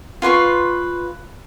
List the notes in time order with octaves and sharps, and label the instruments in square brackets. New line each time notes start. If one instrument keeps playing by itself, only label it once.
[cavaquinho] F4 B4 C6 C#6